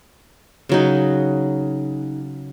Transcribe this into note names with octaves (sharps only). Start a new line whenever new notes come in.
C#3 F#3 D#4